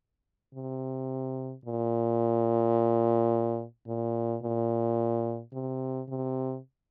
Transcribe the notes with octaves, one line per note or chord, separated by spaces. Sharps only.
C3
A#2
A#2
A#2
C3
C3